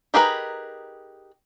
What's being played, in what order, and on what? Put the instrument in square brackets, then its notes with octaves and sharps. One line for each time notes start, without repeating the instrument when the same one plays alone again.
[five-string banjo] D#4 G4 G#4 A#4 B4